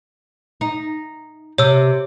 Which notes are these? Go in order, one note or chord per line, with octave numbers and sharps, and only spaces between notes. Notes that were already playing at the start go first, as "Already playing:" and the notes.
D#4
C3 C#5 E6